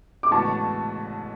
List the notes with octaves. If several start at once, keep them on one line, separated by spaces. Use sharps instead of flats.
D6
A1 A2 G#3 B3 F#4 A5 C#6